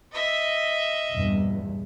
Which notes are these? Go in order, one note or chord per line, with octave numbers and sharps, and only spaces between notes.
D#5 E5
A#1 E2 G2